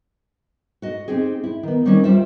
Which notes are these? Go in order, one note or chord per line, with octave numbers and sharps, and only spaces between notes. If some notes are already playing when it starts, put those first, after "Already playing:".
F#4 D#5
C4 D#4 G4 G#4
E4
D#3 B3
D#3 G3 C4 C#4 D#4
D2 G3 F4 C5 E5